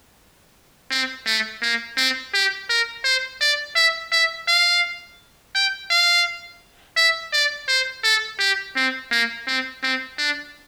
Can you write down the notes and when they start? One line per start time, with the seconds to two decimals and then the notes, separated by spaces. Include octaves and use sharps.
0.91 C4
1.27 A3
1.63 A#3
1.98 C4
2.34 G4
2.70 A#4
3.05 C5
3.41 D5
3.76 E5
4.12 E5
4.48 F5
5.55 G5
5.90 F5
6.97 E5
7.33 D5
7.69 C5
8.04 A4
8.40 G4
8.76 C4
9.12 A#3
9.47 C4
9.83 C4
10.19 D4